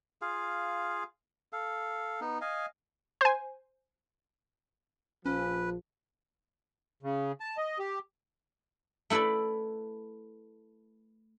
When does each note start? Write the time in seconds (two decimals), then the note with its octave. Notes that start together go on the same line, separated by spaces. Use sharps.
0.22 F4 G#4 F5
1.53 A4 F5
2.21 B3 D#4
2.41 D#5 F5 G#5
3.21 C5 G#5
5.26 A#1 F3 C#4 B4
7.03 C#3
7.40 A5
7.57 D#5
7.79 G4
9.10 A3 E4 A4 B4 D5